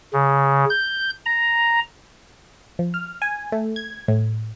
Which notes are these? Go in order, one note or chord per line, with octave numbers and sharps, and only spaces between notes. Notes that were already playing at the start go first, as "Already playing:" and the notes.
C#3
G6
A#5
F3
F6
G#5
A3
G#6
A2